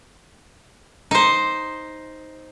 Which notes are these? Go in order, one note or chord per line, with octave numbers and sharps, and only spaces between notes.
D#4 C5